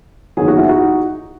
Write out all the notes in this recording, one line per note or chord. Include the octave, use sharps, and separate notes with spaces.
F#1 E2 D#3 F#3 G#4
F#4
E4
D#4 F#4